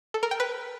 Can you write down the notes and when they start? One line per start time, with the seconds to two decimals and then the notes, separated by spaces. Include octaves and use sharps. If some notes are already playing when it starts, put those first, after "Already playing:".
0.14 A4
0.23 A#4
0.31 G5
0.40 B4